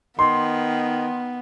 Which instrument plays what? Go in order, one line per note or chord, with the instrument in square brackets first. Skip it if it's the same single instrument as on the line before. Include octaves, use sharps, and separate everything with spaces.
[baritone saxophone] D#3 [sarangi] B3 [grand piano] C6